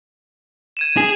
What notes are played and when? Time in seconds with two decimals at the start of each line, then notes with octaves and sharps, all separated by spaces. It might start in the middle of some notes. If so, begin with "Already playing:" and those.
0.77 G#6 D#7 E7
0.97 G#4